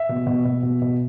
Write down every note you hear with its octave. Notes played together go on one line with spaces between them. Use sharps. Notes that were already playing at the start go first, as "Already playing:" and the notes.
Already playing: E5
B2
B2
B2
B2
B2